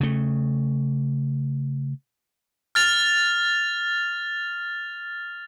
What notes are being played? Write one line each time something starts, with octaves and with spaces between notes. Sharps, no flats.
C#3 A3
F6 A6 F7